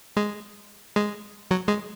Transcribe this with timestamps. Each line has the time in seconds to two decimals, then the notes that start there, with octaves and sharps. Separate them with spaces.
0.17 G#3
0.96 G#3
1.51 F#3
1.68 G#3